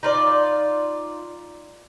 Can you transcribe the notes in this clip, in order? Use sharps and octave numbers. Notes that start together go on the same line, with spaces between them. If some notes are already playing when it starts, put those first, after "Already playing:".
D#4 F4 D5